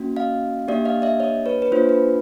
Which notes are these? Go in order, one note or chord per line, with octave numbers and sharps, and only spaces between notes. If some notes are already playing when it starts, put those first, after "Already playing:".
Already playing: A#3 C#4 F#4
D#5 F5
A#3 D4 G4 D5 E5
D#5 F5
D5 E5
C#5 D#5
B4 C#5
B4
A#3 D4 F4 C5
B4